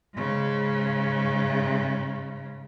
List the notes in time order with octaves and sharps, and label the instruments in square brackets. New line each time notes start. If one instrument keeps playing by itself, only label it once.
[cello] G#2 C#3